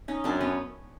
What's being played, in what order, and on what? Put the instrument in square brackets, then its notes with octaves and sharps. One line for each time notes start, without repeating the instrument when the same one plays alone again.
[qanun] C#4 D#4
[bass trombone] F#2 [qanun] C4 D4
[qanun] B3 C#4